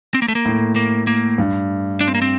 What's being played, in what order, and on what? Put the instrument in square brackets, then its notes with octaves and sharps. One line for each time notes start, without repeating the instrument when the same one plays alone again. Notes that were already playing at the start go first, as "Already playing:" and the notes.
[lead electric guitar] C4
A#3
A3
A#3
[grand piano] A2
[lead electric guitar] A#3
A#3
[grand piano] G2
[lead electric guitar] D4
C4
A#3
C4